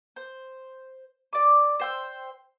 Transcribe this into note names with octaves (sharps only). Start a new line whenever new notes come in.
C5
D5 D6
C5 G5 E6